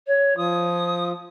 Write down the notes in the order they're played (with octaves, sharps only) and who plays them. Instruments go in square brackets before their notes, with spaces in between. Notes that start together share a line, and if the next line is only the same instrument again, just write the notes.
[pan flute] C#5
[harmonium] F3 F4 [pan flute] D#6